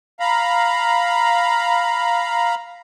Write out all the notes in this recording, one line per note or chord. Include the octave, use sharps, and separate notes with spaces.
F5 A#5 B5